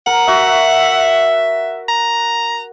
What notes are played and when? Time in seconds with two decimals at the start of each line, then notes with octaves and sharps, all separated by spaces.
0.07 A#4 F#5
0.28 F#4 E5
1.88 A#5